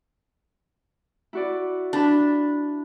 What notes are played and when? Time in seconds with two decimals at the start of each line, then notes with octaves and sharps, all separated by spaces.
1.33 E4 F#4 D5
1.93 D4 A5 B5